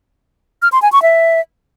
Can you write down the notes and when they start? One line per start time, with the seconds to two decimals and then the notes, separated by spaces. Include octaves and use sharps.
0.62 F6
0.72 C6
0.82 G#5
0.92 C#6
1.02 E5